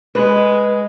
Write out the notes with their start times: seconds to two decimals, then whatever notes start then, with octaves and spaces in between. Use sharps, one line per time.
0.15 G#3 B4